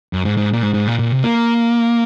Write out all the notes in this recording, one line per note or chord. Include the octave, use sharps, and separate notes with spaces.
F#2
G#2
G#2
A#2
G#2
G#2
A#2
A#2
C3
A#3